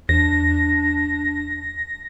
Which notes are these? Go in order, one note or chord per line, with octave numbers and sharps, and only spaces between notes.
E2 D4 A#6